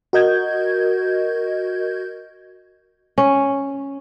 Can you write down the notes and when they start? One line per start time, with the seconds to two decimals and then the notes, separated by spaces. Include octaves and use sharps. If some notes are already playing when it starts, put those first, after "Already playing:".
0.13 F#4 A#4 D#5 G6 G#6
3.18 C#4